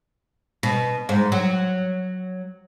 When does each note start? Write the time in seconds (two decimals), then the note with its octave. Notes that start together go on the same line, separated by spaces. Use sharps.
0.63 B2
1.09 G#2
1.32 F#3